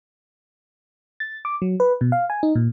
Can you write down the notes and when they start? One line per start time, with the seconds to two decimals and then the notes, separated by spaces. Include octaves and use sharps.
1.20 A6
1.45 D6
1.62 F#3
1.80 B4
2.01 B2
2.12 F5
2.30 G#5
2.43 D#4
2.56 A#2